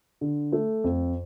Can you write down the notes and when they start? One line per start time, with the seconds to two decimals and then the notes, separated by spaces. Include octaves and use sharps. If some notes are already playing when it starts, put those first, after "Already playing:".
0.21 D3
0.53 A3
0.84 F2